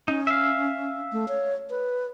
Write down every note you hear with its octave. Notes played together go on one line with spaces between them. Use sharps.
C#4 D#4
E5 F5
A3
C#5
B4